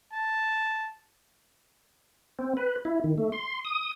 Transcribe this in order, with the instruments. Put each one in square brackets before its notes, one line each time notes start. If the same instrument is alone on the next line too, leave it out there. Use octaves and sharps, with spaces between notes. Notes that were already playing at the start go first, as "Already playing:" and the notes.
[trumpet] A5
[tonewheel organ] C4
B4
E4
D#3
A3
C6
D#6